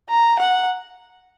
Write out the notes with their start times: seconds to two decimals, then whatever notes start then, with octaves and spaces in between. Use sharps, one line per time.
0.09 A#5
0.39 F#5